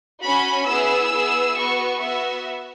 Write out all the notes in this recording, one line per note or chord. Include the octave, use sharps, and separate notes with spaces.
C#4 F#4 B5
B3 E4 G#4 E6
B3 E4 G#4
B3 F#4 C#6
B3 F#4 E5